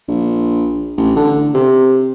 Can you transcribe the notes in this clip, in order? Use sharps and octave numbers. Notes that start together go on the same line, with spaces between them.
A#1
A1
D3
C3